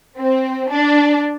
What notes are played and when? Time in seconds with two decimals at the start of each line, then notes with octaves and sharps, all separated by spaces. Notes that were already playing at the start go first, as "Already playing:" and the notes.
0.19 C4
0.72 D4